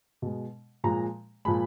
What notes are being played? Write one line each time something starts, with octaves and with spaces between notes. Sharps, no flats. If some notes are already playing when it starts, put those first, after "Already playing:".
B2 G#3
A#2 F3 G#3 A#5
A#2 F3 G#3 B5